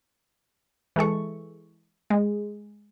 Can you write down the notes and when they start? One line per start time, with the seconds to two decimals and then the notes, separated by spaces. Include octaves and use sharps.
0.96 E3 G#3 A4 C#6
2.10 G#3